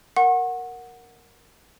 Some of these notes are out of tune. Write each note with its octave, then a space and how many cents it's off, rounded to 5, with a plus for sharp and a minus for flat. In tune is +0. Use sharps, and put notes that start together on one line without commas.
A#4 +0 F#5 -10 C#6 -40